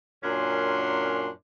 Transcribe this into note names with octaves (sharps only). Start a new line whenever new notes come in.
F#2 A#2 C#4 D4 C6